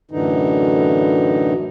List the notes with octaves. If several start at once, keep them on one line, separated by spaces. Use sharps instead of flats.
F#2 A2 D3 E3 D#4